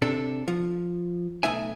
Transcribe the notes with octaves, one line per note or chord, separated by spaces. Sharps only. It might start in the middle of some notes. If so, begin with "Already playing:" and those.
C3 D4 A4
F3
B1 A3 D#4 E5 G#5